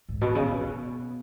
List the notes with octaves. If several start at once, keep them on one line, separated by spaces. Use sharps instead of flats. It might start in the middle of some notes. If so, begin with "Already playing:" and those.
G#2
B2
C#3
C#3
B2